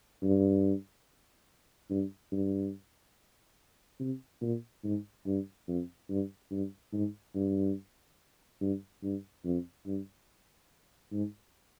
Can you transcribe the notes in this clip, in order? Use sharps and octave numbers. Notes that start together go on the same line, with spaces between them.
G2
G2
G2
C3
A#2
G#2
G2
F2
G2
G2
G#2
G2
G2
G2
F2
G2
G#2